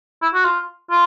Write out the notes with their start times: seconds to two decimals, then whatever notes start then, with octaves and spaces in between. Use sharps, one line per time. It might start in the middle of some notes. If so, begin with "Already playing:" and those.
0.22 E4
0.34 F#4
0.45 F4
0.91 F4